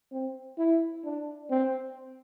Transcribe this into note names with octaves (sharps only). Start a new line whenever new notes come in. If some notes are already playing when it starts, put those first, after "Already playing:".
C4
E4
D4
C4